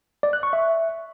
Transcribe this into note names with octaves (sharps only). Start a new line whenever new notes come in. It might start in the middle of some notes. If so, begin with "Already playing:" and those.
D5
F#6
C#6
E5